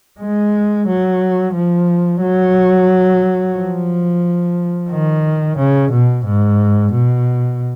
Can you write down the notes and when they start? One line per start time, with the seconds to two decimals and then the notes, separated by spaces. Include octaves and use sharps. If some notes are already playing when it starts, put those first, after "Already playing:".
0.20 G#3
0.87 F#3
1.55 F3
2.21 F#3
3.56 F3
4.90 D#3
5.57 C#3
5.91 B2
6.25 G#2
6.92 B2